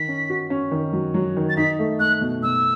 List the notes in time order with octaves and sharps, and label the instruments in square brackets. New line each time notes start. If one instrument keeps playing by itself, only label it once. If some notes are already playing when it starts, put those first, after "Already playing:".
Already playing: [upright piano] D#3 [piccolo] B6
[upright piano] C#4
F#4
C#4
D#3
F#3
F#3
D#3
[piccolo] A6
[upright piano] D#4 [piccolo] B6
[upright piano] A3
[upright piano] A3 [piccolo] F#6
[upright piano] B2
[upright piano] B2 [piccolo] E6